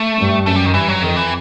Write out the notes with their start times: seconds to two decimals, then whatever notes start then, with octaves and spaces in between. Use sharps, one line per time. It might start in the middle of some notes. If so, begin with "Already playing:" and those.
Already playing: A3
0.18 G2
0.46 F#2 A3
0.56 G3
0.66 D#3
0.74 G2 E3
0.89 F#3
1.03 F2 D#3
1.16 E3